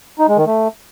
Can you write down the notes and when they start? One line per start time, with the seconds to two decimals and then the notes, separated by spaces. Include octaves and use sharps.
0.19 D#4
0.28 G#3
0.37 D#3
0.46 A3